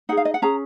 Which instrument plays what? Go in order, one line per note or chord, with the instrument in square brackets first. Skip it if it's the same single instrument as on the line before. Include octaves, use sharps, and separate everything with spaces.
[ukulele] D#4 F#5
G#4
F5
D#5
F#5
C#4 G#4 A#5